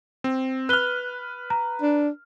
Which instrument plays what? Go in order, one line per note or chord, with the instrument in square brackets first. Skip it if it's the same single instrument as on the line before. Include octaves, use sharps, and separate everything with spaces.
[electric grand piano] C4
[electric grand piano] B4 F6 [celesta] F#6 G7
[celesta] A#5
[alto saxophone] D4